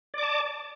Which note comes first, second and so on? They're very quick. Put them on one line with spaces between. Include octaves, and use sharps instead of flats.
D5 D6 A5